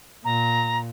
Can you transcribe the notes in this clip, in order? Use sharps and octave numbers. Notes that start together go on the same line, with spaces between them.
A#2 A#5